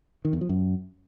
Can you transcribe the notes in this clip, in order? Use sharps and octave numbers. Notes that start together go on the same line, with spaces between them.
D#3
E2
F3
F#2